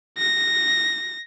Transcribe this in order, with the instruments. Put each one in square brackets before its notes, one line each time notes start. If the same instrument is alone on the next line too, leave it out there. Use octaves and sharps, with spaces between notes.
[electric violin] A#6